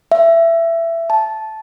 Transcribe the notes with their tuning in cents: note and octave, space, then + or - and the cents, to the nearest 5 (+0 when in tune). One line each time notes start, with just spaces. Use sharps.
E5 +20
A5 -10